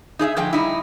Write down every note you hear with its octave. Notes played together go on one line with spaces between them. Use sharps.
D#4 G#4 D#5 E5
D3 F3 G#3 G5
G3 D#4 E4